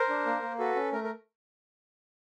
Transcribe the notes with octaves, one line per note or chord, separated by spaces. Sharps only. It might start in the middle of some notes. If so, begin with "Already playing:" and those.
Already playing: A#4 C5
D4
A#3
A#3
F#4 A4 B4
C#4
A3 A#4
A#4